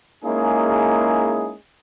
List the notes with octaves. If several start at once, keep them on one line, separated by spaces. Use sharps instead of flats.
G#3 A#3 C#4 D#4 E4 G#4